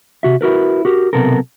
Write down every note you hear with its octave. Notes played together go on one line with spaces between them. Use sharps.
C3 F#4 E5
E4 F#4 A#4 B4
F#4 G4 A#4
B1 E2 C3 B3 A4 A#4